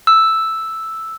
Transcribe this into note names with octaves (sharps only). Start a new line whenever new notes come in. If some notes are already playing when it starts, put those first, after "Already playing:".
E6